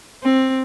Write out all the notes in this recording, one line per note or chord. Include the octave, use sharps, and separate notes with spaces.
C4